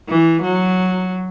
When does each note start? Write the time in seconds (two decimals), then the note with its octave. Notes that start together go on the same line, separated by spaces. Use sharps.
0.08 E3
0.42 F#3